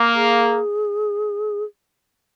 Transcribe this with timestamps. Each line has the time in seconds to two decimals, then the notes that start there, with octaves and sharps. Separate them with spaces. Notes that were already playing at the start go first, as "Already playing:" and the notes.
Already playing: A#3
0.15 G#4